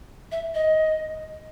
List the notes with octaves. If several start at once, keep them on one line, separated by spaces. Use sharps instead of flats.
E5
D#5